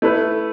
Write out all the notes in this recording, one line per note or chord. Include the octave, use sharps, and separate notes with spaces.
A3 E4 B4